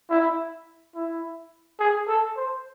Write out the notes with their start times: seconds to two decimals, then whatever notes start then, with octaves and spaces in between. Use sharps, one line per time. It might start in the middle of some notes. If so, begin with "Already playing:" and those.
0.10 E4
0.95 E4
1.80 G#4
2.08 A4
2.37 C5